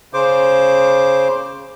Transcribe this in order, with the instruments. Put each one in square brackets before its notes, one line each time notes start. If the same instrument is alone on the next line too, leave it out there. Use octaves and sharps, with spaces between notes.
[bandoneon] C#3 C5 D6